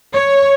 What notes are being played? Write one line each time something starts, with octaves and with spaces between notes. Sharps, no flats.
C#5